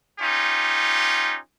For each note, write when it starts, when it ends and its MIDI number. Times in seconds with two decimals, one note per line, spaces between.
0.20 1.38 61
0.20 1.38 63
0.20 1.38 65
0.20 1.38 67